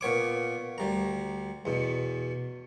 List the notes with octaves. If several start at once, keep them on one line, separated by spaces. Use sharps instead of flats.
A#2 B3 C#5 D6
D2 G3 A#5
E2 B2